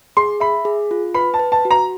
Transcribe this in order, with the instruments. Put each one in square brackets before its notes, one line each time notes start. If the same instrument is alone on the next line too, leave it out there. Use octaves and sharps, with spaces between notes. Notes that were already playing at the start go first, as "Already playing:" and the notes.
[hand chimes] G#4 [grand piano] C6
[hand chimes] E5 [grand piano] B5
[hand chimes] G#4
F4
[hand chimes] B4 [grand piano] B5
[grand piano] A5
[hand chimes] B4
[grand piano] A5
[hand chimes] F#4
[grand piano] A#5